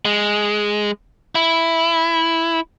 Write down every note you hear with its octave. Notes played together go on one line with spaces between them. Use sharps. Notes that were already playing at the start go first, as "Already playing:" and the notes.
G#3
E4